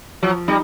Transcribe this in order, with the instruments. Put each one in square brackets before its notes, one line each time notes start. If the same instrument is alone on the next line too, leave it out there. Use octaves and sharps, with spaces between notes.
[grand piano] F3 [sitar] F#3
[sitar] G3 [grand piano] D#4